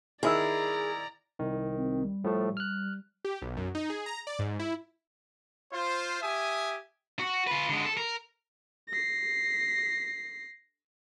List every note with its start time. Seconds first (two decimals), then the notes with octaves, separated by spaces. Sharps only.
0.23 D#3 E4 G#4 D5 A#5 E6
1.39 C2 D#3
1.77 C4
2.05 G3
2.24 A2 F3 A3
2.57 F6 F#6
3.25 G4
3.41 B1
3.57 F#2
3.75 D#4
3.90 G#4
4.06 A#5
4.27 D5
4.39 G#2
4.59 E4
5.73 F4 C5
6.22 G4 E5 G#5 D#6
7.19 F#4
7.47 F4 B4
7.69 D3 G#3
7.85 A4
7.97 A#4
8.89 A#6 C7